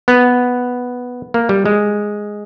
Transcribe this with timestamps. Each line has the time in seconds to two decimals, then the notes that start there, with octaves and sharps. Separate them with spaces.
0.08 B3
1.34 A#3
1.49 G3
1.66 G#3